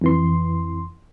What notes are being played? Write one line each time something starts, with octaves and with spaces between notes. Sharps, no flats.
F2 E3 C6